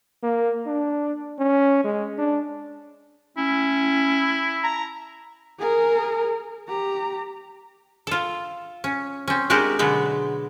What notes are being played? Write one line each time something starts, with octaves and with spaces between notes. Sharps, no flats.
A#3
D4
C#4
G#3
D4
C#4 E4
A#5
G#4 A#4
G4 A#5
F4 A4
C#4
C4 C#4
G#3 D4 F#4 G4 A#4 D#5
B2 D3 F#3 G#3 B3